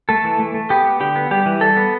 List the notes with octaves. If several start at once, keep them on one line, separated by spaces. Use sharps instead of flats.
A3 A4
E3
A3
A3
B3 G4
B3
D3 G4
B3
G3 G4
E3
G3 A4
B3